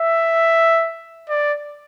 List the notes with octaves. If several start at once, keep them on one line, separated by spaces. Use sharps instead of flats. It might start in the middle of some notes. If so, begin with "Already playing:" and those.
Already playing: E5
D5